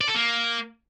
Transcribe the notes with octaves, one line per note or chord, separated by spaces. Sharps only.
D5
A4
A#3